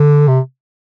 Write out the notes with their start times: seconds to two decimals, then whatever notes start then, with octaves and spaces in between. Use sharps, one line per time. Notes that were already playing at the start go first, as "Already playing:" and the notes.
Already playing: D3
0.28 C3